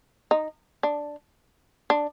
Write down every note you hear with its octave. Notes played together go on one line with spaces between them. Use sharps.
D#4
D4
D4